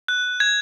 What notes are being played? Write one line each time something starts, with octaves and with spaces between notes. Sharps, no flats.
F#6
G#6